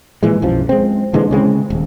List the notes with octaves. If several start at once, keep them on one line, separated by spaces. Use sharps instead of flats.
A#2 E3 G#3
B1 F#2 F3
G#3 C4
A#2 D3 E3 G#3
C#3 G#3 A#3 C4
D#1